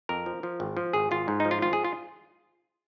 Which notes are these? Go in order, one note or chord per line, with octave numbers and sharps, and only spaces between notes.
F2 A#4
F3
F3
G#1
F3
G#1 G#4
G#1 F4
G#2
F3 D#4
F4
G#1 F4
G#4
F4